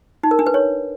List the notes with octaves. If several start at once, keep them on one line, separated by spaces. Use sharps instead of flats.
D#4
A#4
D4
B4
C#5